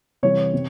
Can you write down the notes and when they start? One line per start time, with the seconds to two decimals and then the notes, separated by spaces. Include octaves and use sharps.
0.23 C3 E3 G3 C#5
0.54 C3